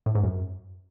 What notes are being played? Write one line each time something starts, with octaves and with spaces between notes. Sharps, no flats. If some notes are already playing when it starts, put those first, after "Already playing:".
A2
G#2
F#2